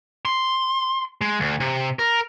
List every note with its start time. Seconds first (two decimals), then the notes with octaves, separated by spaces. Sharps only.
0.25 C6
1.21 G#3
1.40 D2
1.60 C3
1.99 A#4